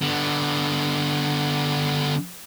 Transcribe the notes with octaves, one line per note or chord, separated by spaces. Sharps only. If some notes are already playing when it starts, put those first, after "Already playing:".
D3 B3